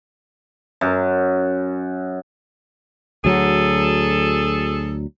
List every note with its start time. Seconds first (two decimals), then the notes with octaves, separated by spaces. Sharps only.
0.81 F#2
3.25 D2 F#3 G#4 A4